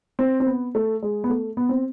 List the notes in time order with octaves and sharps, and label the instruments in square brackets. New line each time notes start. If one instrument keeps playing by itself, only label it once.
[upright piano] C4
C4
B3
A3
G#3
B3
A3
B3
C4